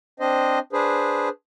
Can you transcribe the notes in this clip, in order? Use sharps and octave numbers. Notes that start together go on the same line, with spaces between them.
C4 D4 C5 D#5
D4 G#4 B4 C5